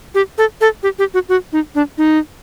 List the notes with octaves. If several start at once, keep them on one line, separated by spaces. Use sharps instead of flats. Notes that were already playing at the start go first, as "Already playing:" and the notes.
G4
A4
A4
G4
G4
F#4
F#4
D#4
D4
D#4